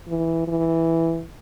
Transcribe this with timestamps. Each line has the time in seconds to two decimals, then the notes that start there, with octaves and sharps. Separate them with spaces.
0.08 E3
0.47 E3